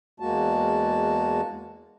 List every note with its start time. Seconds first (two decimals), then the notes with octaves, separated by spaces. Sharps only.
0.20 E2 G#3 A#3 F#4 A5